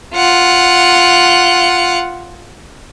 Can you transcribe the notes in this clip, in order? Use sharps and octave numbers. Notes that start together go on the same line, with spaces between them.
F4 F#5